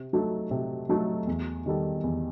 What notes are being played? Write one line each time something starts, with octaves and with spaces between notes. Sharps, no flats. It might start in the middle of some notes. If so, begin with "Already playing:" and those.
Already playing: C3
F#3 A3 D#4 A4
C3
F#3 A3 D#4 A4
E2
D#3 G3 D#4 A4
E2